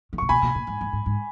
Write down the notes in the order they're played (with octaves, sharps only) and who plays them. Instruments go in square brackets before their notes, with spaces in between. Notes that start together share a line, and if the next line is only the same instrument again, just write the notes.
[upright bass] D#3
[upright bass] C#3 [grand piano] C#6
[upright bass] B2 [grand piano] G#5 B5
[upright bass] B2
A#2
G#2
G#2
G#2
G#2